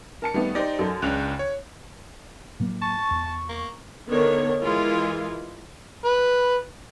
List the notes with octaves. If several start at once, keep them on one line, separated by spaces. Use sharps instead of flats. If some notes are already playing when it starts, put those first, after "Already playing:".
A#4 A5 C#7
D#3 G3 A3 B3
D#4 G4 C5 D5 A#6
F#2 A4
C#2 C#3 D4 F#6 F7
C#5
A2 F#3 A#3
A5 C#6
E2
A#3
D3 D#3 B3 A#4 C#5
E3 G#3 E4 F4 A#4 G#5
B4